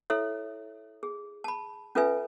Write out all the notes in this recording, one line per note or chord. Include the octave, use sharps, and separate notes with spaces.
E4 A4 C#5 E5
G#4
A5 B5
C#4 F4 A4 B4 E5 G#5